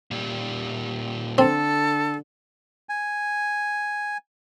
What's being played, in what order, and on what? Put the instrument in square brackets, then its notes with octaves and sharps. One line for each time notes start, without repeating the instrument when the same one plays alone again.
[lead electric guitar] A#2 G3
[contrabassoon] D3 [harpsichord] C4 [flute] A4
[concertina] G#5